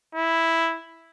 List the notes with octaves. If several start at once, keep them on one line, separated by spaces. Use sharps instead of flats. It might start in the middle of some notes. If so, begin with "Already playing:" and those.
E4